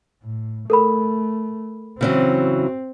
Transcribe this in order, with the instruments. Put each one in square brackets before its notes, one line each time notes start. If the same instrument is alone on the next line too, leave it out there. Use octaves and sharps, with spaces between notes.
[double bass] A2
[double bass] A3 [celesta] A4 A#4 B5
[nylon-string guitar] C#3 E3 F#3 [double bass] C4